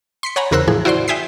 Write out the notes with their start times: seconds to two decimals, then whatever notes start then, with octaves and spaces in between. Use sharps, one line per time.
0.23 C6 B6 C#7
0.36 C#5 F#5 G#5 A#5 B5
0.51 E2 C#3 A#4 C5 E6 F#6
0.67 A2 E3 F3 G#4
0.85 E4 F#4 C5 D5 C6
1.08 E5 G5 G#5 D#6 B6 C7